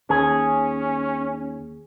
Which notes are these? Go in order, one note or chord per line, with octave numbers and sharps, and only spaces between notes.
D#2 C#4 G#4